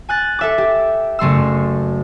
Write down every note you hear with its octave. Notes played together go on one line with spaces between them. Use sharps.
G#5 F#6 A6
A4 E5 D6
G4
F#1 A3 C6 E6